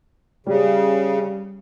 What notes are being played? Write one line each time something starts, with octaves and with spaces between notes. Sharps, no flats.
C#3 G3